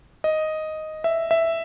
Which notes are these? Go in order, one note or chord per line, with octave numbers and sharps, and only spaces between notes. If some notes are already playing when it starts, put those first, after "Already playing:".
D#5
E5
E5